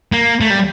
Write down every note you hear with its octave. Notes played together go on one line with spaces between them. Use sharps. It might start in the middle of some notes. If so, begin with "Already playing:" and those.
A#3
A3
G3